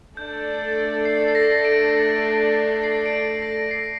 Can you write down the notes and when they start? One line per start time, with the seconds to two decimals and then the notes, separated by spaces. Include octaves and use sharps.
0.17 A3 D4 A4 D5 G6
1.05 C7
1.28 C7
1.35 A#6
1.65 D7
2.83 C7
3.06 D7
3.13 C7
3.42 A#6
3.71 C7